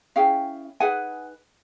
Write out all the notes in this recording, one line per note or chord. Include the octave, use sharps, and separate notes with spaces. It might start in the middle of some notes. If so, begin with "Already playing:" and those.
C#4 E4 G#4 F5 G5
D#4 G#4 B4 F#5 G#5